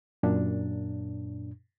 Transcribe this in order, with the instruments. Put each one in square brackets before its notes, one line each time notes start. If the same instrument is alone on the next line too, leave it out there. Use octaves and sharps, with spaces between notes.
[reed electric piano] F#2 A#2 D4